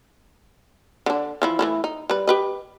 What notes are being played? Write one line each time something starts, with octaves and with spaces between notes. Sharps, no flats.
D3 D4
E3 F3 E4
E3 A3 E4
D#4
G3 B4
G4 B4 D#5